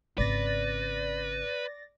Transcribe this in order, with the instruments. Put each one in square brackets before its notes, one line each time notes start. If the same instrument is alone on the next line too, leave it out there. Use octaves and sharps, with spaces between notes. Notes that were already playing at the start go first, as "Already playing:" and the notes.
[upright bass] G#1 C#3 [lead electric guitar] B4 [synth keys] D5 A6 A#6